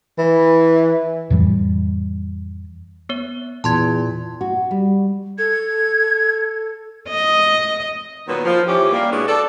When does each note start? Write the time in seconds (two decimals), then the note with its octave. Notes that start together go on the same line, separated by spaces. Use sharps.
0.19 E3
1.30 F2 A2 E3 G3
3.09 B3 C#5
3.64 E2 A#2 A5 C6 G#6
4.41 F#4
4.71 G3
5.38 A4 G#6
7.09 D#5
8.28 A#2 D#3 F#3 B3
8.46 F3
8.68 D#2 E3 C#4 G4
8.93 G3 A#3
9.11 B2 G#3 B3 C#4 D4 E4
9.27 A4 D5